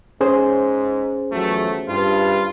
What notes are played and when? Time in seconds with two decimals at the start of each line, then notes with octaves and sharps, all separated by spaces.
0.21 G#2 C#4 G#4 C5
1.32 E2 F3 F#3 A3
1.88 G2 F4